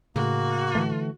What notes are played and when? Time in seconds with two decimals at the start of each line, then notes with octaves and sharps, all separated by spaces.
0.16 A2 C#3 A#3 F#4
0.75 D3 E3 A3